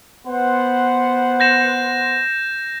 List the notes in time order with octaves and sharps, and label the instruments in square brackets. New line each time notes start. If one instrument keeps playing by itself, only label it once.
[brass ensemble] B3 C5 F#5
[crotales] G6 A#6 E7